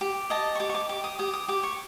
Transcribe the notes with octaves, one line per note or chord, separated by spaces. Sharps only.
G4
D#5 A5
C#6
G4 D6
C#6
D6
G4 D6
D#6
G4 D#6
D#6
G4 D6
C#6